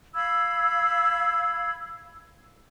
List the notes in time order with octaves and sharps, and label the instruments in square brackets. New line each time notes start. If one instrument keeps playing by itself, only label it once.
[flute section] F5 B5 E6 G#6